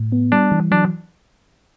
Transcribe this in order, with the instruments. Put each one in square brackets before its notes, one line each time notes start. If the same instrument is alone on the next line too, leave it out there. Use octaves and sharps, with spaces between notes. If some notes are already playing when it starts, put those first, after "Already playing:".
Already playing: [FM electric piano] A2
B3
[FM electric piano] G3 [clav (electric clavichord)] D4
[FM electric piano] E3
[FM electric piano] F#3 [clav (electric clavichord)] D4